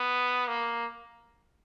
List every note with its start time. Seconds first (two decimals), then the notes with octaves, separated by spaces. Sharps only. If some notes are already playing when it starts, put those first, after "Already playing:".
Already playing: B3
0.48 A#3